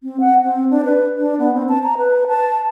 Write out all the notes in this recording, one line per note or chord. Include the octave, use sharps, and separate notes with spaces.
C4
F#5
C4
D4
B4
D4
B3
C4
A5
A#5
B4
A5